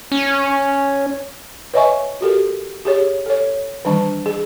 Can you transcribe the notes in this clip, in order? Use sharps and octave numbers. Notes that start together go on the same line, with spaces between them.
C#4
B4 C#5 D#5 E5 G#5 C#6
F#4 G4 A4 A#4
G4 G#4 C#5
A4 C#5
D#3 E3 G3 D4 A5 C#6
G#4